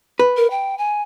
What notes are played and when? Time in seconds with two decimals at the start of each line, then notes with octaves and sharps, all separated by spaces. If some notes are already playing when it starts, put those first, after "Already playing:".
0.19 B4
0.37 A#4
0.51 G5
0.78 G#5